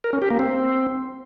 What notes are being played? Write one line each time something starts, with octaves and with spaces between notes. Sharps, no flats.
A#4
C#4
G4
A#3
C4